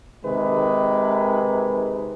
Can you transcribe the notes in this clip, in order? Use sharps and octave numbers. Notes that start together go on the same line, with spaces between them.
C3 D#3 G#3 B4